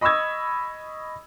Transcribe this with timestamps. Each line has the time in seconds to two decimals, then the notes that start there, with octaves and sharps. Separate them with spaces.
0.01 D#5 B5 C#6 D#6 E6 G#6